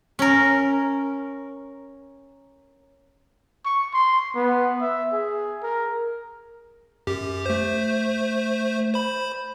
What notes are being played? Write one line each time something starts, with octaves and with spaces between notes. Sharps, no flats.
C#4 A#4
C#6
C6
B3
E5
G#4
A#4
F#2 G4
A3 C5
C5 B5